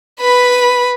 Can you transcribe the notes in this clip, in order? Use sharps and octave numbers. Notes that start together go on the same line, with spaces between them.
B4 B5